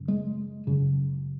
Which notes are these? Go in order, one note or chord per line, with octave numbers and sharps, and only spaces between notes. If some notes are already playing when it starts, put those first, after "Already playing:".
Already playing: F#2 C#3
G#3
F#2 C#3